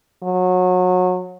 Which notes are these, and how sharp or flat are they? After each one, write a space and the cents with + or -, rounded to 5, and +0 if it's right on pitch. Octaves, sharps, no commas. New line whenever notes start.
F#3 -25